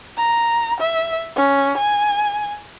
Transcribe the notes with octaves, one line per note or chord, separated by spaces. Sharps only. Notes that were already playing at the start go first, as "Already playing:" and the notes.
A#5
E5
C#4
G#5